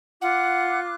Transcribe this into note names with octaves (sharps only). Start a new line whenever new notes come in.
F4 F#5 D6 F#6